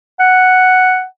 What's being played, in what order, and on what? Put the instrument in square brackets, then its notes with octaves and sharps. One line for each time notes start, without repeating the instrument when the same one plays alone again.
[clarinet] F#5